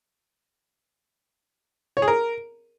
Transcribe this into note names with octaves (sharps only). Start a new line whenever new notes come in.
C#5
G#4
A#4